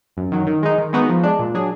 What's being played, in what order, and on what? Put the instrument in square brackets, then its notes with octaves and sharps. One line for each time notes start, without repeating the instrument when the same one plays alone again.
[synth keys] F#2
D#3 F#3
D#3
G#3 D#4
D#3
G#3 B3 D#4 F#4
F3
G#3 D4
A#2
F#3 D4 G#4